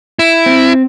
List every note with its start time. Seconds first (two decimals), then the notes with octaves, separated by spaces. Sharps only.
0.19 E4
0.46 C4